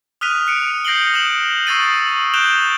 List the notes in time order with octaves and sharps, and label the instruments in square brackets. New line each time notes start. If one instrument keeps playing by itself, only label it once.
[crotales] D#6 F6 F#6 B6 D#7 F7
F#6 C#7 D7
G6 A#6 C7 D7 F#7 G7
D#6 E7 F#7
C#6 D#6 E6 A6 C7 D#7
F#6 G6 D7 E7 F7 G7